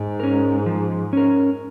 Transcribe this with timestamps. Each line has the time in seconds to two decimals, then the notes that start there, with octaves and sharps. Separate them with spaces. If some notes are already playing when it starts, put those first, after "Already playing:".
Already playing: G#2
0.20 C#4 A#4
0.66 F3
1.13 C#4 A#4